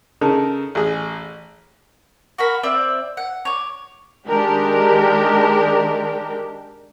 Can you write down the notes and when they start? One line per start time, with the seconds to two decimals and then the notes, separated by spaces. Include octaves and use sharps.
0.21 C#3 D#4 A4 A#4
0.75 A1 G#4
2.38 F#4 A#4 B5
2.63 C4 D5 E5 E6
3.17 F#5
3.45 C#5 D6
4.28 D#3 G#3 D4 G4 A#4